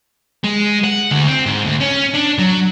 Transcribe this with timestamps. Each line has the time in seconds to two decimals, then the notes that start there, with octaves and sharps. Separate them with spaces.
0.44 G#3
0.84 F#5
1.11 D2
1.28 C4
1.46 G#2
1.65 D2
1.80 C#4
2.14 D4
2.38 F#3